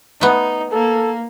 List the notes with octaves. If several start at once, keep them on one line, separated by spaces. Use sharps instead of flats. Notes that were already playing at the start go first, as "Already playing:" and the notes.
A3 B3 D#4
A#3 A4